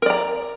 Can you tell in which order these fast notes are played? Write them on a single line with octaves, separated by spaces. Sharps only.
A#4 D5 A#5